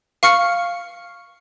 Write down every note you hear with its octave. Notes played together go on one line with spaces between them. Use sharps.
F5 C#6 F6 C#7